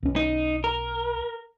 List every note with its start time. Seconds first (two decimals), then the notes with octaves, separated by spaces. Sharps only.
0.03 B1 C#4
0.16 D#4
0.64 A#4